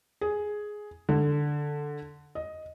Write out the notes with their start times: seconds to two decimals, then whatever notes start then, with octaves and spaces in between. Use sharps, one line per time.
0.21 G#4
1.09 D3
2.35 D#5